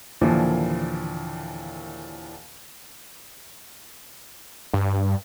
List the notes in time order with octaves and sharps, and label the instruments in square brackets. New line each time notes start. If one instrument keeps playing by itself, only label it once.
[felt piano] D#2 A#2 D3 E3 F3
[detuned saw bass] G2